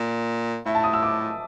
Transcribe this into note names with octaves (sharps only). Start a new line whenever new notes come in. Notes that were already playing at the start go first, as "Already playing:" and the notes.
Already playing: A#2
A2 E5
A5
D#6
E6
D6